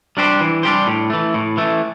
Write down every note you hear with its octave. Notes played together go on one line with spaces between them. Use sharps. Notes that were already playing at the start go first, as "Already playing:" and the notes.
G3 D4 G4 C5
E3
G3 D4 G4 C5
A2
E3 A3
A2
E3 A3